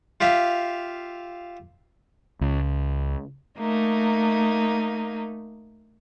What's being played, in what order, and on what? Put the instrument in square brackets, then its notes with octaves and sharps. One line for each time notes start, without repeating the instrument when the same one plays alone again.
[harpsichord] F4 G4 E5 F5
[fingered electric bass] C#2
[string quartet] A3 A#3 D#4